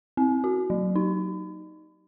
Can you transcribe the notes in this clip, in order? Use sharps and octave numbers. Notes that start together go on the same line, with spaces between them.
C4
F#4
F#3
D#4